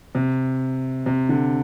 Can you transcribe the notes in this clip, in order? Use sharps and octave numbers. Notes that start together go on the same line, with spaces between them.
C3
C3
D3